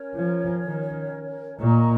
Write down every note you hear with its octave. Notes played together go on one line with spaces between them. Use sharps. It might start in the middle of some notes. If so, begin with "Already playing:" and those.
Already playing: C#4 A#4 C#5
F3
D#3
A#2 A#4 D#5 A#5 C#6